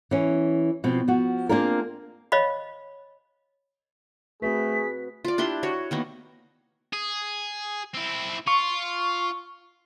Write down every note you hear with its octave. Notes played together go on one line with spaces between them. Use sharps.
E3 C#4
B2 F3 C4
F3 F#4
A#3 C4 D4 F4 G#4 A#4
C#5 D#5 F5 B5
A3 C4 F#4 G#4 B4 B6
F4 D5
D4 E4 G4 C6
F#4 C#5
D#3 A#3 B3
G#4
C4 E4
F4 C#6